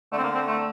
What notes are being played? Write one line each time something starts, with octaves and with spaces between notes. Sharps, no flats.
D3 A3
C4
A#3
C4
A3